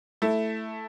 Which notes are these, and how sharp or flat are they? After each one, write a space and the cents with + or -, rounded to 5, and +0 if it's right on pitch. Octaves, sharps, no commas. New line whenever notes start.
A3 +0 E4 +0